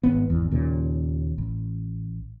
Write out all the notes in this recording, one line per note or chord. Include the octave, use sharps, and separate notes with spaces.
G#1 G#2 B3
G#1 E2
D#2 A#2 C#3
A1